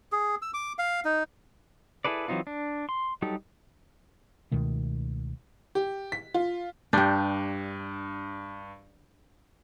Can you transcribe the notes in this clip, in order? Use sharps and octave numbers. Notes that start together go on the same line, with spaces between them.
G#4
E6
D6
F5
D#4
E4 G#4 A4 B4 D5
E3 F#3 C4 D#4 F4
D4
C6
F#3 G3 D#4 G4 A4
C#2 B2 D#3 A3
G4
B6
F4
G2 D4 G4 G6